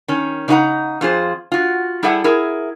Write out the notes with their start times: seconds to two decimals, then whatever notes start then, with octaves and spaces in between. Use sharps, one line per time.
0.08 D#3 C#4
0.48 C#3 D#4 G4 C5 F#5 A#5
1.01 F2 F4 G#4 C5
1.52 F4 F#4
2.03 G3 E4 G#4 A4 E5 F#5
2.24 E4 G#4 A#4 E5